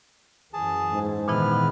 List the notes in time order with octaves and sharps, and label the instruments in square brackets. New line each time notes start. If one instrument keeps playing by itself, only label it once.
[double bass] F#2 E3 [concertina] G#4 A5
[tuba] G#2
[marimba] A#2 E3 E4 [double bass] D#3 B3 [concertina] B4 F6